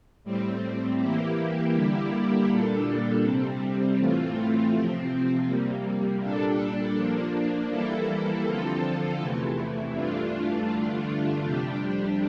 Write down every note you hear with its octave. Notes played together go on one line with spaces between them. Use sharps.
A2 G3 C4
E3 A#3 E4 G4
D3 G3 A#3 E4 G4
A#2 G3 D4 A4
C3 G3 C4
A2 E3 A3 C4 F4
C3 F3 C4
C3 G3 A#3
A#2 G3 D4 A4
F3 A#3 D4
E3 G3 A#3 E4 A4
D3 F3 C4 F4 A4
E2 C3 E3 A3 E4
G2 E3 A3 D4 F4
G2 D3 A3 D4 F4
F2 C3 G3 D4 G4